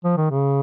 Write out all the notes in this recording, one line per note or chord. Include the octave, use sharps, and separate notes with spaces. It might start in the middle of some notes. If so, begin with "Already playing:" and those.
F3
D#3
C#3